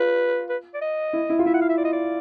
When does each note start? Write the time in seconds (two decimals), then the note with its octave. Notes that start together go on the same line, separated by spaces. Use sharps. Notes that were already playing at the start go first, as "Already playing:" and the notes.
Already playing: F4 B4
0.50 B4
0.74 D5
0.81 D#5
1.13 E4
1.30 E4
1.39 F4
1.46 E4 E5
1.54 F#5
1.62 F5
1.69 E5
1.77 D5
1.85 D#5
1.93 D5